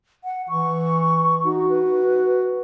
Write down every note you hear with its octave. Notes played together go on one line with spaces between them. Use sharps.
F#5
E3 C#6
D#4 F#4
B4